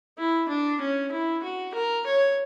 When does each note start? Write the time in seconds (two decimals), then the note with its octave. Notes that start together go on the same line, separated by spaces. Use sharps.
0.18 E4
0.49 D4
0.81 C#4
1.11 E4
1.43 F#4
1.74 A#4
2.06 C#5